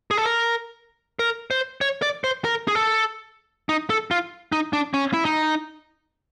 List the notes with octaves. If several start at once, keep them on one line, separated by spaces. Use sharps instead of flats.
G#4
A4
A#4
A#4
C5
C#5
D5
C5
A#4
G#4
A4
D#4
A4
F4
D#4
D4
C#4
E4
D#4